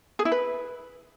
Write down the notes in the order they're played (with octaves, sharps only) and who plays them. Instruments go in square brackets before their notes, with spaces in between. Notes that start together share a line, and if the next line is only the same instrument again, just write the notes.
[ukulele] G#4
E4
B4